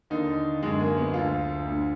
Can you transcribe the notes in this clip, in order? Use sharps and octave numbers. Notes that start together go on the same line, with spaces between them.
D#2 D3 D#4
F#2 D3 G#3
A#3
B3
D2 D3 F4
D2 D3